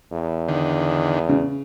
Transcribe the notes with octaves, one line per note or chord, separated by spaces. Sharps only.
E2
D3 D#3
C#3